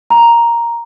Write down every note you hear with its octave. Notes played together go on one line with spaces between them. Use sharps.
A#5